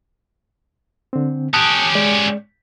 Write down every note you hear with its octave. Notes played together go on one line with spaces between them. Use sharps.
D3 C4
C#4 G4 A5 D#6 F#6
G#3 D5